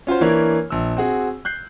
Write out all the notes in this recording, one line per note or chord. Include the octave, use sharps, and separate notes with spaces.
C#4 F4 F#4 C5
E3 A#3 D4 E4 A#4 C#5
A#1 E6
C4 F#4 G#4
F#6 G6 C7